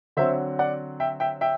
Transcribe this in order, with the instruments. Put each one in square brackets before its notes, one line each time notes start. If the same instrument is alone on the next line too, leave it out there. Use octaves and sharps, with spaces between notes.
[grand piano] D3 F#3 C4 C5 E5
D5 F#5
E5 G5
E5 G5
E5 G5